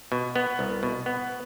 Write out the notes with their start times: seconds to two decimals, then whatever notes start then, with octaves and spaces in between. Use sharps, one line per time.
0.12 B2
0.36 B3
0.59 C2
0.83 B2
1.06 B3